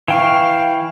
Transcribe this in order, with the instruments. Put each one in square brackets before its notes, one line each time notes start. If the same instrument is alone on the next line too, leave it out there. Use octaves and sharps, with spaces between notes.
[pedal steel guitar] E3 G5 C#6 [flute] F5